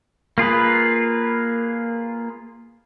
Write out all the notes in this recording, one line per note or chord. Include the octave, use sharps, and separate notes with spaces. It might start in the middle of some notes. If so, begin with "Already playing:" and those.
A#3 F4 G#4 B4